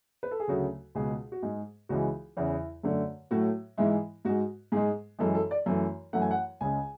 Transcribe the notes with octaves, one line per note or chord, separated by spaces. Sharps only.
B4
A4
G#4
D2 C#3 F#3 A3 F#4
C#2 B2 G#3 G#4
F#4
G#2 G#3 G#4
C#2 C#3 E3 G#3 F#4
E2 C#3 E3 E4
F#2 D3 A3
A2 F#3 A3 F#4
G#2 E3 G#3 E4
G#2 G#3 F#4
G#2 G#3 G#4
F#2 E3 G#3 A4
A4
D5
F#2 E3 A3
F#2 E3 A3 F#5
G#5
F#5
C#2 C#3 G#3 G#5